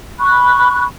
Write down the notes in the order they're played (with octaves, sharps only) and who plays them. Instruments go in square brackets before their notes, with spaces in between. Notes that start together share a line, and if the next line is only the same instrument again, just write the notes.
[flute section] B5 C#6 F#6